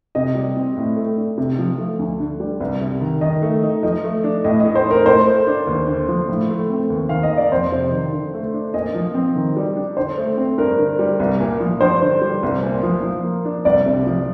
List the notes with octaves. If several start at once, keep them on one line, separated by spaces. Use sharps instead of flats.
C3 D#5
G3
C4
A2
A3
D4
C3
F3
A3
D2
D3
G3
C2
C3
D#3
D#3 D#5
A3
D#4
F3 D#5
A3
D4
A2 D#5
A3 D#5
C5
D#4
A#4
A2 C5
A3
D4
D#2
D3
F3
A2
A3
C4
D#2
D#3 F5
D#5
A#3
D5
F2 C5
C3
D#3
D3
A3
D4
A#2 D#5
F3
C4
D#3
G3
D4
D3 C5
A3
C4
G2 A#4
D3
G3
C2
A#2
F3
G2 C5
D3
G3
C2
A#2
F3
F3
A#3
D4
C2 D5
C3
F3